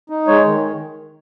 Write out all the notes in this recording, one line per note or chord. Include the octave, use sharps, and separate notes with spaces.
D#4
G#3 C#5
D#3